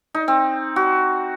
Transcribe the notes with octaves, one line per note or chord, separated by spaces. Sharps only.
D#4
C4
F#4